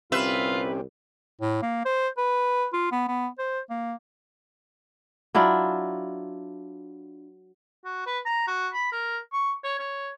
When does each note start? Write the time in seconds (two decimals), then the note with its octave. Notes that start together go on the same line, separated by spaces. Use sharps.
0.12 C2 C4 C#4 F4 G4 B4 E5
1.41 A2
1.62 A#3
1.85 C5
2.17 B4
2.73 F4
2.92 B3
3.08 B3
3.39 C5
3.70 A#3
5.35 F#3 D4 E4 F4
7.85 F#4
8.06 B4
8.26 A#5
8.47 F#4
8.73 B5
8.92 A#4
9.33 C#6
9.64 C#5
9.79 C#5